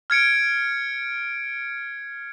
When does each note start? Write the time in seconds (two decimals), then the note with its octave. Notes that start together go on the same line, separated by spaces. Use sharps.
0.10 F6 G#6 C#7 D7